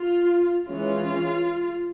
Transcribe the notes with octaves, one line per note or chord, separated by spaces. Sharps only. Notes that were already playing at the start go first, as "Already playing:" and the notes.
Already playing: F4
E3 G#3 C#4 F4